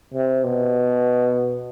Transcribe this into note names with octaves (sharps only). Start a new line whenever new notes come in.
C3
B2